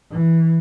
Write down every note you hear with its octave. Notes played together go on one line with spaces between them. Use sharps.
E3